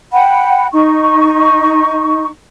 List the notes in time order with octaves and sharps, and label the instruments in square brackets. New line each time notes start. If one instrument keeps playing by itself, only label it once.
[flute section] F#5 G5 B5
D#4 C#6